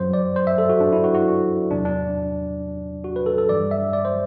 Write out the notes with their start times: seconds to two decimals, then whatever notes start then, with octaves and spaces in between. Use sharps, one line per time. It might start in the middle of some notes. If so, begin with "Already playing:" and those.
Already playing: F#2 F#3 C5
0.13 D5
0.36 C5
0.47 E5
0.58 A4
0.69 F#4
0.81 D4
0.93 E4
1.04 F#4
1.15 F#4
1.70 E2 C3 F#3 D4
1.85 D4
3.04 F#4
3.16 B4
3.26 A4
3.38 A4
3.49 G2 E3 G3 D5
3.71 E5
3.93 D5
4.05 C5